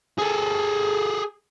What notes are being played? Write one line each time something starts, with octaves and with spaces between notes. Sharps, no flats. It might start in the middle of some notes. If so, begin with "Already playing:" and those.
G#4 A4